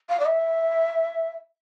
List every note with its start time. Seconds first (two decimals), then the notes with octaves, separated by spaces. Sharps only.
0.10 F5
0.20 D5
0.26 E5